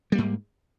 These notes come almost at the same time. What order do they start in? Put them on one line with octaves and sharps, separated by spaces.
G3 A#3 G#2